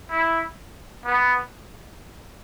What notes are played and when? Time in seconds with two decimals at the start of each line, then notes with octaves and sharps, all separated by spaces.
0.10 E4
1.05 B3